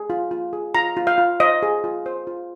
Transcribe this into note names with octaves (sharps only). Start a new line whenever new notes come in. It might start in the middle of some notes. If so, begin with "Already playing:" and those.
Already playing: G#4
F4
F4
G#4
F4 A#5
F4
F5
F4
C5 D#5
G#4
F4
C5
F4